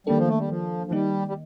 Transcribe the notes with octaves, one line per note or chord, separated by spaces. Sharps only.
D#3 G3 A#3 D4 A4
F3
A3
G3
F3
F3
D#3 G3 A#3 D#4
G3